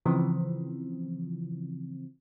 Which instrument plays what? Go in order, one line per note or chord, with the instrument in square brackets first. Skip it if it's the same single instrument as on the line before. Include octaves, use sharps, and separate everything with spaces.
[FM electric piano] C#3 E3 F3 C4